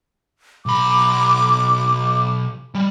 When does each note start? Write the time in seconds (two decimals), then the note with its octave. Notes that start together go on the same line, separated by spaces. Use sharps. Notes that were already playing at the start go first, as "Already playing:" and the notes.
0.66 B1 B5 D6
2.75 G3